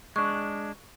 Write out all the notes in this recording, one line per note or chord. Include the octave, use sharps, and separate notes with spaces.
G#3 D4 C#6